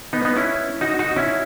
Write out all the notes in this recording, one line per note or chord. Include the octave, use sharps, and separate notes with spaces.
B3 D#4
B3 D#4
C#4 E4
D#4 F#4
D#4 F#4
C#4 E4